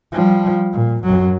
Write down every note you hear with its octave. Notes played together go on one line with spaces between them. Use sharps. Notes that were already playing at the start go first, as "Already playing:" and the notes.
F3 G3
A#2
F#2 F#3